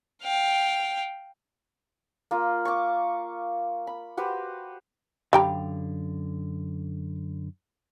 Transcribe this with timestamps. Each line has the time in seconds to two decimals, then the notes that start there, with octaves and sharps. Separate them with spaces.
0.23 F5 G5
2.31 A#3 F4
2.65 C#6 D6
3.87 B5
4.17 F#4 G4 B4 C5
5.33 F#2 D3 G3 F5 G5 A#5